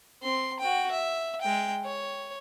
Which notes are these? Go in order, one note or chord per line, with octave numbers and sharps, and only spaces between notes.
C4 C6
F#4 G5
E5
G#3 G5
C#5